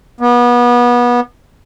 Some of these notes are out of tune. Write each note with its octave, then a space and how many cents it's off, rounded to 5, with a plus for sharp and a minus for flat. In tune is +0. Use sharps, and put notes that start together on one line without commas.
B3 -30